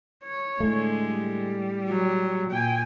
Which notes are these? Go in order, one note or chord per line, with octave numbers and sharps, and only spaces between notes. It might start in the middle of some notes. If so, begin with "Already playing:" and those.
C#5
A2 D3 G#3 A3
G3
F#3
A#2 G5 G#5